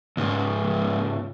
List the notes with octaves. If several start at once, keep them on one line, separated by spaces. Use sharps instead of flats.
C#2 G#2